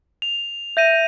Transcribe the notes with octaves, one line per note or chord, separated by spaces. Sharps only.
F7
E5 G6 A#6 D#7